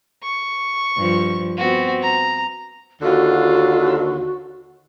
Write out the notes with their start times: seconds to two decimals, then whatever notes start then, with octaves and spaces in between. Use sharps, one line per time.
0.23 C#6
0.97 G2 F3
1.57 B3 C4 F#4
2.02 A#5
3.02 D#2 D3 F4 F#4